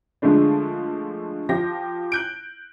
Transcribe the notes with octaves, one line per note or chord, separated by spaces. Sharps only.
D3 F3 G#3 A3 D4
F3 G4 A#6
F#6 G6 D7